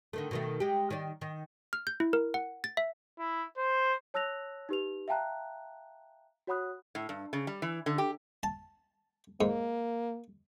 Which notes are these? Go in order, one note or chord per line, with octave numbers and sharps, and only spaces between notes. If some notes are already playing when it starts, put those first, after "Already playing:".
D3 D#3 A3
B2 D#3 A3
G#3 G4
D#3 D5
D#3
F6
G6
E4
A#4
F#5
A6
E5
E4
C5
C#5 A5 E6 F#6 A#6 F7
D#4 G4 B4 F7
E5 F5 G5 A5 A#5 F#6
F#4 C#5 F#5 B5 D#6 F#6
A2
G2
C#3
G3
E3
D3
G4
A5
G#2 A#3